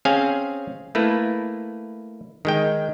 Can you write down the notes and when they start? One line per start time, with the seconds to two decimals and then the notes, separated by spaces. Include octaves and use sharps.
0.05 C4 C#4 G#4 F5 G#5
0.95 A3 A#3 E4 B4
2.45 D#3 G#3 G5